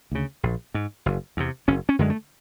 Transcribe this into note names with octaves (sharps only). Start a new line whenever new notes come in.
D2 C#3
A#1
G#2
F#1
E2 C3
F#1 C#4
C#4
F#2 D3 G#3
A3